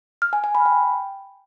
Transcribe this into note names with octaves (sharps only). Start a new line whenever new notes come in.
F6
G#5
G#5
B5
G5